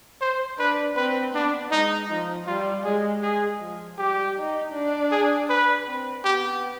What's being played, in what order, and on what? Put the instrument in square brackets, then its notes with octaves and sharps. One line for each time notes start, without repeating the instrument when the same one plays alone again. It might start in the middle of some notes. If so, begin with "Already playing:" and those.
[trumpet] C5
[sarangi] D4 [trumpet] B4
[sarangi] C4 [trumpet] B4
[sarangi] B3 [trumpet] D4
[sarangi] G#3 [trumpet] D#4
[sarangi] F3 [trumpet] D#4
[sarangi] G3 [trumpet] F4
[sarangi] G#3 [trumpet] G#4
[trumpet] G#4
[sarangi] F3
[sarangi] G3 [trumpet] G4
[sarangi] D#4
D4
[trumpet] G#4
B4
[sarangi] C4
[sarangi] B3 [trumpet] G4